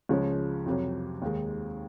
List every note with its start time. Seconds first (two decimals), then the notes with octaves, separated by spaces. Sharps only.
0.09 C#2 C#3 F3 G#3 C#5
0.66 F2 C3 F#3
1.22 D#2 D#3 G#3